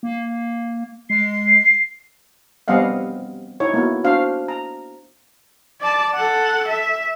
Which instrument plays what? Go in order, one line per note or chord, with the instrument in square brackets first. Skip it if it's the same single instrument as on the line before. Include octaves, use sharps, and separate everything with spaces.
[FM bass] A#3
[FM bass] G#3 [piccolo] C7
[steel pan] G3 B3 C4 D#5 F5 F#5
D#4 E4 C#5
A#3 B3 E4 F#4
D4 F#4 C5 F5
A#5
[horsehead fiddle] D5 A5
A4 F#5
E5